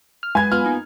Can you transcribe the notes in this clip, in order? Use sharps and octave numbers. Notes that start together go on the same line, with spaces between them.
F6
F#3 G#3 B4 G#5 B5 G#6
B3 F4 F6
A#3 D#4